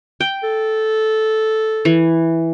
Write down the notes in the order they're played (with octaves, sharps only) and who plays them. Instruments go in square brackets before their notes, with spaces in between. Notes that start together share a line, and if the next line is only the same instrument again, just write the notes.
[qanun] G5
[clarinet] A4
[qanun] E3